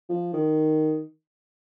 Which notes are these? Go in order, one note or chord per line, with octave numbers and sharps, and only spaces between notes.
F3
D#3